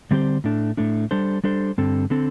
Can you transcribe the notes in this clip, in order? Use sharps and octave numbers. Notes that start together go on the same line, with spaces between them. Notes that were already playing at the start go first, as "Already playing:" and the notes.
D3 G3 C4 G4 C5
A2 A3 D4
A2 A3 D4
G3 D4 A4 C5
G3 D4 A4 C5
G2 D3 C4 A4
D3 C4 A4